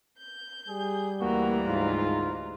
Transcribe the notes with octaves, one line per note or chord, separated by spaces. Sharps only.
G6
G3 G#4
D2 E3 A#3 F#4 A#5
G#2 F4